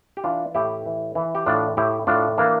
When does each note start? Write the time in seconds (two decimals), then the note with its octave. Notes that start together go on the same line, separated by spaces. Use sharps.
0.17 G4
0.24 E3 D4 F4
0.55 A2 E4 G4
0.86 E3
1.15 E3
1.35 G4
1.46 A2 D4 F4
1.77 A2 E4 G4
2.07 A2 D4 F4
2.38 E3 A#3 D4